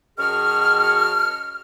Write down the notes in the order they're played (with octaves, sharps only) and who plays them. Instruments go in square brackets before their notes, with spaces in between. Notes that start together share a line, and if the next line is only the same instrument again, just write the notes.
[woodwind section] F#2 D#3 F#4 G#4 A5 F6